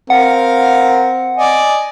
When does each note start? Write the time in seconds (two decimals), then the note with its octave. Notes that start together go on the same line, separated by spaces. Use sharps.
0.10 C4 A#4 F5 F#5
1.37 D5 D#5 G#5